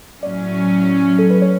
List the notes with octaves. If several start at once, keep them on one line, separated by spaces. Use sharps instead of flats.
A2 F#3 C#4 D5
A4
B4
C#5